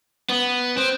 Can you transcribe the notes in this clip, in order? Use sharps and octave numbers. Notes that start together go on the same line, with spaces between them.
B3
C4